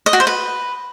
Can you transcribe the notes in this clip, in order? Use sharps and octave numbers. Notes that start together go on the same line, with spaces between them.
D#5
F#4
C5
B4